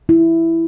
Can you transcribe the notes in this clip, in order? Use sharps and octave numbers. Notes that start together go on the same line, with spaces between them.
E4